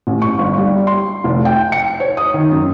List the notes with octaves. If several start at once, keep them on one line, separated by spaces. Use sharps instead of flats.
A1
C#6
G1
G3
C6
F1
G5
C#7
C#5
D#6
D#3
F#2